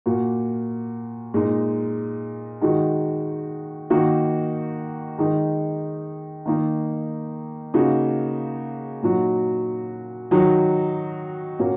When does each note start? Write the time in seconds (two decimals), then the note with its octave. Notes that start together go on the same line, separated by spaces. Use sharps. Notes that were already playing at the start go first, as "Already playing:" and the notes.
0.06 A#2 A#3 F#4
1.34 A#2 G#3 D#4
2.61 D#3 G#3 D#4 F#4
3.90 D#3 A#3 D#4 F#4
5.18 D#3 G#3 D#4
6.46 D#3 A#3 D#4
7.74 C#3 A#3 D#4 F#4
9.03 A#2 F#3 D#4 F#4
10.31 D#3 F#3 D#4 F#4
11.59 A#2 A#3 C#4 F#4